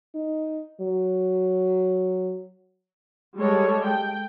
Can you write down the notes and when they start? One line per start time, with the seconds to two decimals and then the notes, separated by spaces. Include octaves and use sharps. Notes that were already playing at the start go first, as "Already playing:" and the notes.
0.15 D#4
0.81 F#3
3.38 G3 G#3 A4 C#5
3.85 G5